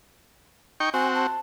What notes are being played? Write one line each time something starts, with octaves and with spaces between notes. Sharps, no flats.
D#4 G5 C#6
C4 F#4 G#5
A5